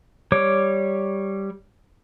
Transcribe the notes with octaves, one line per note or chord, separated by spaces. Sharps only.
G3 C#5 D6